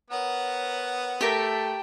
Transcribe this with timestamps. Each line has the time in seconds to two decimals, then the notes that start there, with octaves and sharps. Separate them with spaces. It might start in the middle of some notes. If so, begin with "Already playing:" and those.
0.10 B3 A#4 C#5 F#5
1.21 A3 G4 A#4 G5 A5